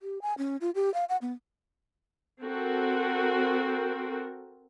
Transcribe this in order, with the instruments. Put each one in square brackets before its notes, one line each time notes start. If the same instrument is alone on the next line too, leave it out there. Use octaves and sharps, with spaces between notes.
[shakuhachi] G4
G#5
C#4
F4
G4
F5
F#5
B3
[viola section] C4 F#4 A4 A#4